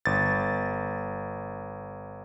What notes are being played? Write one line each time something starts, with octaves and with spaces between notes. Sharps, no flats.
G1 A6